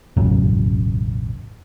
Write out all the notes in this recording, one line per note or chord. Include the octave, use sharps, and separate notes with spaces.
E1 A1 F#2 C#3